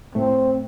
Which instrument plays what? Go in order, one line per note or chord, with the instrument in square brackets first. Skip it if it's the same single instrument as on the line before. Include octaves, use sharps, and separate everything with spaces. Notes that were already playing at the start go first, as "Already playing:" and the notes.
[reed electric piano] A2 A3 [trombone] C4